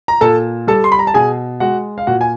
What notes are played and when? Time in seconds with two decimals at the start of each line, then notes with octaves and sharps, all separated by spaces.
0.08 A#5
0.21 A#2 A4 A5
0.67 G3 A4 A5
0.84 C6
0.92 B5
0.99 A#5
1.07 A5
1.14 B2 G#4 G#5
1.60 G#3 F#4 F#5
1.98 F5
2.07 A#2 F#4 F#5
2.21 G#5